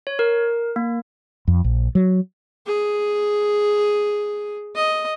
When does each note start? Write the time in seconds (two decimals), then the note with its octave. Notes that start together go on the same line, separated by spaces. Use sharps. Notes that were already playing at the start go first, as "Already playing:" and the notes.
0.07 C#5
0.19 A#4
0.76 A#3
1.48 F2
1.64 A#1
1.95 F#3
2.67 G#4
4.76 D#5